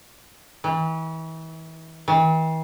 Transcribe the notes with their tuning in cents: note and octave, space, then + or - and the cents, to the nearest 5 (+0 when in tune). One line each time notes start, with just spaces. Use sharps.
E3 -35
E3 -45